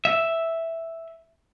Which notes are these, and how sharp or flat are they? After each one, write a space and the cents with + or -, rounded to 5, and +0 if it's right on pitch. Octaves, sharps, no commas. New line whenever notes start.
E5 +0